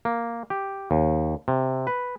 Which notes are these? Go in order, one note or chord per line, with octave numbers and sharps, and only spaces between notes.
A#3
G4
D#2
C3
B4